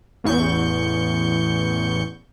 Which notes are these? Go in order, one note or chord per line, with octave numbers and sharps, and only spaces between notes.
A1 E2 C#6 G6